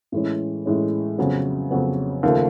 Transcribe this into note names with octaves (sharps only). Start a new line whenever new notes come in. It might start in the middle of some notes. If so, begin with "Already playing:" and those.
A2 E3 G#3 C#4
A2 E3 G#3 C#4
F2 C#3 F#3 B3
F2 C#3 F#3 B3
D#2 C#3 F3 A3